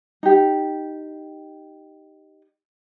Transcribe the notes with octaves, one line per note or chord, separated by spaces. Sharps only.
D#4 G4